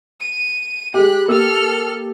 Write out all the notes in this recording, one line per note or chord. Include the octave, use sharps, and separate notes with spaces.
D#7
G#3 G4 B5 F#6
A#3 G4 A4 E6 F6